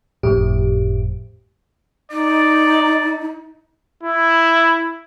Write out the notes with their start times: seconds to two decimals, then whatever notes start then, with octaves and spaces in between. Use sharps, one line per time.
0.23 G1 F2 A2 G4
2.12 D#4 D5
4.03 E4